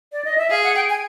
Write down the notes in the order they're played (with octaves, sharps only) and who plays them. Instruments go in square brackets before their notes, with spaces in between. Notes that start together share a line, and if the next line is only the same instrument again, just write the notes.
[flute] D5
D#5
E5
[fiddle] G#4 [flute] F5
[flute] F#5
G5
G#5